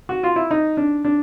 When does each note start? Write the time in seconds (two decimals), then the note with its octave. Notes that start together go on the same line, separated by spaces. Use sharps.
0.09 F#4
0.23 F4
0.36 E4
0.51 D#4
0.77 D4
1.05 D4